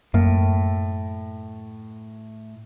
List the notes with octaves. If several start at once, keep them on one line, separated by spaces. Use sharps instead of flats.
F#2 A2 A#3